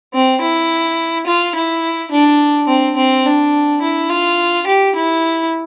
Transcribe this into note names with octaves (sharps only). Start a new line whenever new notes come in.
C4
E4
F4
E4
D4
C4
C4
D4
E4
F4
G4
E4